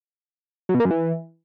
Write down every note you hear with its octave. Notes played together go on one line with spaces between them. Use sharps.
F#3
B2
A#3
F#2
E3